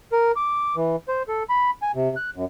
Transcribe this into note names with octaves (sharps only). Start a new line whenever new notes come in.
A#4
D6
E3
C5
A4
B5
G#5
C3
F#6
F#2